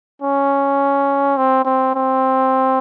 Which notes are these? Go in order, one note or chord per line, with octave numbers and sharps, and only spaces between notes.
C#4
C4
C4
C4